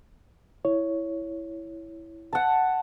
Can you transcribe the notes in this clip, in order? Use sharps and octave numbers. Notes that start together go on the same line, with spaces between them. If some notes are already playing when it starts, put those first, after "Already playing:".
E4 C#5
F#5 A5